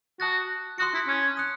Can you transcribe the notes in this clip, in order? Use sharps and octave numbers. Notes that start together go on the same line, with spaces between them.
F#4 A5 D#6 F#6 A6
F#4 C6 D#6 F#6 C#7
E4
C#4
D#6 F#6 C#7